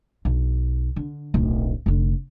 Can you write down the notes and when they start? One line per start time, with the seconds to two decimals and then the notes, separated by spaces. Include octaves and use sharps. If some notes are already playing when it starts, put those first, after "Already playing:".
0.25 B1
0.96 D3
1.34 D1 B1
1.86 F1 D3